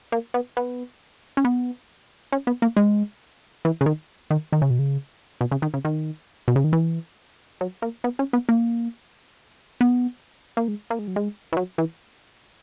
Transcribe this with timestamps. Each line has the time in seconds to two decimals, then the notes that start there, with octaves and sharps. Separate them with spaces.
0.12 A#3
0.34 B3
0.57 B3
1.37 C#4
1.45 B3
2.32 C#4
2.47 B3
2.62 A#3
2.77 G#3
3.65 E3
3.81 C#3
3.86 D#3
4.30 D#3
4.53 D#3
4.62 C#3
4.70 B2
4.79 C#3
5.41 B2
5.52 C#3
5.62 D#3
5.74 C#3
5.85 D#3
6.48 B2
6.56 C#3
6.64 D#3
6.73 E3
7.61 F#3
7.82 A#3
8.04 B3
8.19 C#4
8.33 B3
8.49 A#3
9.81 B3
10.57 A#3
10.68 G#3
10.90 A#3
10.99 G#3
11.08 F#3
11.16 G#3
11.52 E3
11.57 F#3
11.78 E3